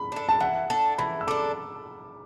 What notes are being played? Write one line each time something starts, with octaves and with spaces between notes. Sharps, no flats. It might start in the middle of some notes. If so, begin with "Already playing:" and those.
Already playing: B5
D4 A4
A5
E3 F#5
D4 A4
E3 B5
E6
D4 A4 D6